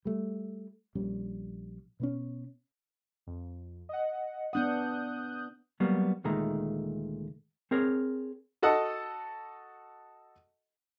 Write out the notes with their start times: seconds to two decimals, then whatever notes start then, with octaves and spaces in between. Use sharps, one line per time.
0.05 G3 A3
0.95 A#1 G3 C#4
2.00 B2 B3 C#4
3.27 F2
3.89 D#5 F#5
4.53 B3 D4 F#5 D#6 F#6 G6
5.80 F#3 G3 A#3 B3
6.24 D2 A#2 D#3 G#3 A3 A#5
7.71 C4 G#4 A#4 C#5
8.62 F#4 A4 D#5 F#5 A5 D#6